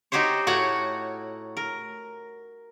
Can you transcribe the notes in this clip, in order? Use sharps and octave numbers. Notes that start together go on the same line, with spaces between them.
D#4 F#4 G4 C5 C#5
A2 F#4 C#5 F#5
A#4